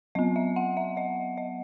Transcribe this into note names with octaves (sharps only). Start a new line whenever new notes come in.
F#3 B3 D#5
E5
F#5
E5
D#5
D#5